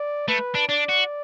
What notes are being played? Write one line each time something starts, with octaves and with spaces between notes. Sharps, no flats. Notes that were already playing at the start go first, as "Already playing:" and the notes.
Already playing: D5
A3 B4
D4
D4 D5
F#4